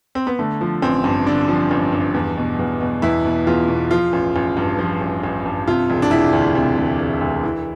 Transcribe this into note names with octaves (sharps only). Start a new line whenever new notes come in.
C4
B3
D3 A3
F3
A1 C4
G2
D3 D4
F3
A1
G2
E2
B2
E2
B2
E2 E4
B2
E2 F4
B2
F3 F4
A1
A1
G2
F3
A1
A1
G2
C3 F4
E1
D4
E1 E4
D2
C3
E1
E1
D2
E3